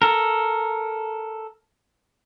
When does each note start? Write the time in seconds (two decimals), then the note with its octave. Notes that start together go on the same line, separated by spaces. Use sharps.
0.02 A4 A#4